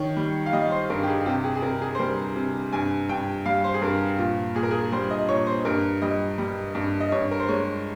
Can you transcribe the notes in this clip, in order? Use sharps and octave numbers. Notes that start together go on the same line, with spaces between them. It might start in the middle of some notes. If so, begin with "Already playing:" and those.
Already playing: D#3 C#5
G3
F5
G3 D#5
C5
G2 A#4
G4
G#4
C3 G4
G#4
G#4
C3 A#4
G#4
C5
G3 A#4
C3
G2 G#5
G2 G5
G3 F5
C5
G#4
G2 A#4
A#2 F4
A#2 G#4
A#4
G#4
G3 C5
D#5
A#2 C#5
C5
G2 A#4
G3 D#5
G3
G2
D#5
G2 C#5
A#4
C5
G#3 C#5